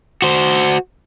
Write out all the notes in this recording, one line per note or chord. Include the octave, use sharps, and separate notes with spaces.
F#4 C5